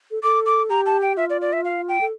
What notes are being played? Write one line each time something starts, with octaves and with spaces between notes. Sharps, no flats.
A4
A4 D6
D6
G4 A#5
A5
G5
F4 E5
D5
D5
E5
F5
G5
A4